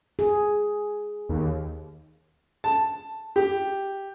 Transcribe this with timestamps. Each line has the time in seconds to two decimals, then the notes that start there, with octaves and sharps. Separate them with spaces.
0.19 G#4
1.29 D#2
2.64 A5
3.36 G4